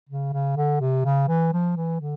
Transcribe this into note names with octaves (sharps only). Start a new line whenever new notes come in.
C#3
C#3
D3
C3
C#3
E3
F3
E3
D3